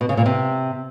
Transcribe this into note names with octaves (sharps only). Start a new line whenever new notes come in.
B2
C#3
A#2
C3